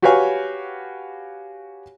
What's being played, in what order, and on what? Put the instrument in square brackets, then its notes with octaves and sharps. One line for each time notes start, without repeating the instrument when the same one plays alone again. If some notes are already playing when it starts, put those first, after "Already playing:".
[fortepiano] F#4 G4 B4 C#5 F5 G#5